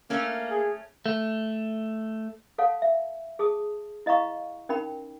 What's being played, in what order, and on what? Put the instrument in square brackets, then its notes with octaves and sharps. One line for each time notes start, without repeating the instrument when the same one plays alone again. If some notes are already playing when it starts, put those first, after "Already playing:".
[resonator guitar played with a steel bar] A3 C#4 [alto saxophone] A#3
[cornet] G#4
[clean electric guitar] A3
[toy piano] A4 C#5 F5 F#5 A5
E5
G#4 A5 D#6
E4 D#5 F5 A#5 C#6
C#4 D#4 A#4 G5 B5